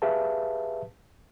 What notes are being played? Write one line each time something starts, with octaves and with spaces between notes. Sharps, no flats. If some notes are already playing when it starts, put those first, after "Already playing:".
G4 G#4 B4 E5 F5 A5